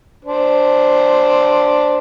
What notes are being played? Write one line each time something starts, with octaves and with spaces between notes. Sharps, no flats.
D4 C5